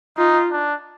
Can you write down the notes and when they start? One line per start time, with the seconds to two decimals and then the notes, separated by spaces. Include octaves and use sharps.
0.17 D#4 F4
0.51 D4